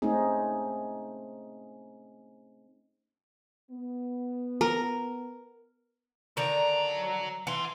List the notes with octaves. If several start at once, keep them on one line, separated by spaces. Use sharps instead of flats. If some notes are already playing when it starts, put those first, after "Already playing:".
A3 C4 C#4 D#4 G#4
B3
A#4
D3 D#3 F#3 A#5
E3 F#5 C6